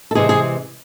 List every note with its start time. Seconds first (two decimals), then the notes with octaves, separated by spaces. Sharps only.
0.11 A4
0.15 C3 E3 G#3 G#4
0.29 G#4